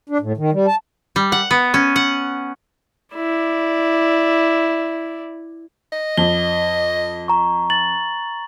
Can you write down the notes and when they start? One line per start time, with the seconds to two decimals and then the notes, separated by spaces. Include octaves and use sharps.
0.09 D4
0.21 A2
0.37 D#3
0.53 G3
0.67 A5
1.16 G3
1.32 F#5
1.51 B3
1.74 C#4
1.96 F#5
3.15 E4 D5
5.93 D#5
6.18 F2 G7
7.28 A#5 C#6
7.70 A6 F#7